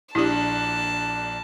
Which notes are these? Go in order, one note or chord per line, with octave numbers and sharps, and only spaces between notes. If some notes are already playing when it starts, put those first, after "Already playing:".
A#1 D4 E4 G4 A5